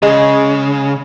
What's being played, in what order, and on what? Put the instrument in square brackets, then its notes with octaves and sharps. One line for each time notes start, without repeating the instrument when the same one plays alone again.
[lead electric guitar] C#3 [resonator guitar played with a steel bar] G#3